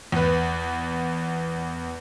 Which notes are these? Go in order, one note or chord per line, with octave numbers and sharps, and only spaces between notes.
E2 B4